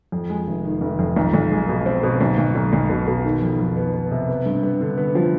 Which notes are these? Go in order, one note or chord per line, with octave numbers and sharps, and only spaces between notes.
F2
G#3
F1
D#3
F1
F2
B1
B1
G#3
B2
C4
B2
B1
B1
B1
B1
B2
B2
D#3
F2
F2
B3
B3
C3
B3
G2
B3
D3
B3
F3